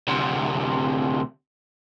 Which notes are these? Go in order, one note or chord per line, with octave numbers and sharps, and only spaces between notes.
D2 C3